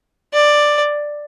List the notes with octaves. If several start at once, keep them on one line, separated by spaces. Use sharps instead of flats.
D5